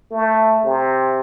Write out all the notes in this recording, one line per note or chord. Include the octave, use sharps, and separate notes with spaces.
A3
C3